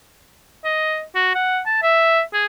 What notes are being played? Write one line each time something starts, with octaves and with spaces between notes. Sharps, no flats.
D#5
F#4
F#5
A5
E5
G#4